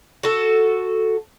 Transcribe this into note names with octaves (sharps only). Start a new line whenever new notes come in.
F#4 A4